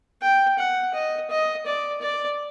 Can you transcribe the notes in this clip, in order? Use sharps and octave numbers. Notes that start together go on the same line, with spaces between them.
G5
F#5
D#5
D#5
D5
D5